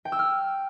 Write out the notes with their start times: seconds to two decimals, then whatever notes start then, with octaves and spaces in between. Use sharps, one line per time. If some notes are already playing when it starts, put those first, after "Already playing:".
0.05 G5
0.12 E6
0.19 F6